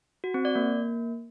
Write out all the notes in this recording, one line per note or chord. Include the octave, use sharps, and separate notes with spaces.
F#4
C4
D5
A#3